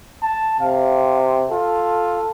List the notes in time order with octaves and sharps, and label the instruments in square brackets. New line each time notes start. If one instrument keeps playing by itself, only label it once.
[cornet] A5
[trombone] C3 [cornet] F5
[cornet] F4 [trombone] A4